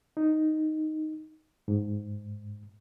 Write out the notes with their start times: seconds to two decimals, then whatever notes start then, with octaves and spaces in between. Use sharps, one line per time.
0.17 D#4
1.68 G#2